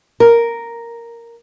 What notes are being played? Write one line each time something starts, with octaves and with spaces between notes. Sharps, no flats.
A#4